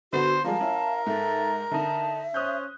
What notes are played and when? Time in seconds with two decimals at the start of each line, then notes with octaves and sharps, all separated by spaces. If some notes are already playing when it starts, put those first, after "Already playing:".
0.13 D3 B3 F#4 C5
0.44 F3 G3 G#3 A#4 F5 A5
0.60 C#4 E4
1.06 G#2 A4 E5
1.71 D3 D#4 E5 A5
2.34 C#4 C5 D#6 F#6 G6